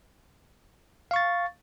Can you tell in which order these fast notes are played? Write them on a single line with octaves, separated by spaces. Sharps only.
F5 C#6 A6